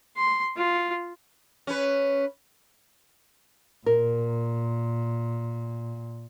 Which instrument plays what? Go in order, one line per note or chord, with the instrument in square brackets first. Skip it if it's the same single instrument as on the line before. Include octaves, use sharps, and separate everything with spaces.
[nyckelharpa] C6
F4
[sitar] C#4 B4
[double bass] A#2 [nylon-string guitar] A#4